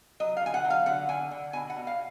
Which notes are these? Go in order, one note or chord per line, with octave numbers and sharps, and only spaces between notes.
F#3 D#5
F5
D3 G#5
F#5
F#3
F5
D3 F#5
D3 G#5
D3
B2 G#5
F#5
B2
F5